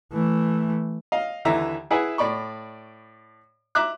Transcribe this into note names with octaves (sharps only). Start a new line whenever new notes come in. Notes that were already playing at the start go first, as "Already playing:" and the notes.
E3 A3
D#5 F5
D#2 D3 E3 E5 A#5
E4 G#4 B4 E5 F#5 G#5
A2 D5 B5 C#6
E5 A#5 D6 F#6